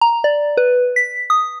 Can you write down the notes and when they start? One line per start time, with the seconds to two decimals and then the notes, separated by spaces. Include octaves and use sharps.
0.01 A#5
0.24 D5
0.57 B4
0.96 B6
1.30 D#6